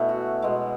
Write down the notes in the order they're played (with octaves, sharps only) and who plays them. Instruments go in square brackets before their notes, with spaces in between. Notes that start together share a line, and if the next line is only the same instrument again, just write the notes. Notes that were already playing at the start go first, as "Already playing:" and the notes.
Already playing: [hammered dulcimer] B2 A3 C#4 E4
F#4
B2 G#3